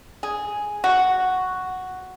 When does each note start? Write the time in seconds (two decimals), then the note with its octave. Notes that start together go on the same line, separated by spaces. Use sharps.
0.23 G#4
0.84 F#4